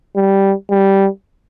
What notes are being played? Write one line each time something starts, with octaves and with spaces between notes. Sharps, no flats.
G3
G3